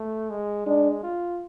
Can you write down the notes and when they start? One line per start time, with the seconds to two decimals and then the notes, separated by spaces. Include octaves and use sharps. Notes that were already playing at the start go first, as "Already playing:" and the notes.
Already playing: A3
0.30 G#3
0.67 G#3 D4
1.03 F4